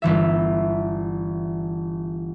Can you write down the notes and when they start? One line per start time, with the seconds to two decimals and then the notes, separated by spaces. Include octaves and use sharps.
0.02 G1 E3 E5